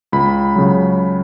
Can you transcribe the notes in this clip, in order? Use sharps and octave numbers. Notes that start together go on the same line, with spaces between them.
C#2 B5
C#3 F#3